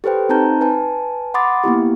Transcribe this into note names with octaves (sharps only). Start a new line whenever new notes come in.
G4 A4 B4 C5 G5
C4 D#4 C5 A5 A#5 G6
B4 G#5 A5
F#5 B5 C6 D6 D#6 A6
A#3 B3 E4 G4